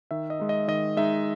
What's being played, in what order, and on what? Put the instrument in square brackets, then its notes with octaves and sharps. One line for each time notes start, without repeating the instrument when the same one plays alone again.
[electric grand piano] D#3 E5
D#5
G#3 D#4
D#5
D#3 D#5
G#3 D#4 E5